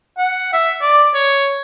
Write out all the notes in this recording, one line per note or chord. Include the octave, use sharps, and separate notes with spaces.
F#5
E5
D5
C#5